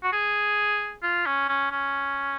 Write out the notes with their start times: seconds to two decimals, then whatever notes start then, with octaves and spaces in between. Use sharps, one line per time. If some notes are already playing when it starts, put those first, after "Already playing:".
0.03 F#4
0.13 G#4
1.03 F4
1.26 C#4
1.48 C#4
1.71 C#4